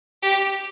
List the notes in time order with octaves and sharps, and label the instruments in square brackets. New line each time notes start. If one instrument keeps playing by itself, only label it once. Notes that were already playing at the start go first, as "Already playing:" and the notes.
[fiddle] G4